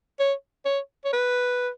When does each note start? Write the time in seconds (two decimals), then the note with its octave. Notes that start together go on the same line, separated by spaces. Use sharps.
0.20 C#5
0.65 C#5
1.05 C#5
1.13 B4